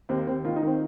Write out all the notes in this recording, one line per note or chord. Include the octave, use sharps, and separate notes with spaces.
D#2 C4
A#3
D#2 C4
D#3 F4
D#4
D#3 C4